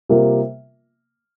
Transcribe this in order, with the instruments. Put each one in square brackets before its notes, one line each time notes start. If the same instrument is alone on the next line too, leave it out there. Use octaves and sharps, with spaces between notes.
[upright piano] C3 G3 A#3 F4 A#4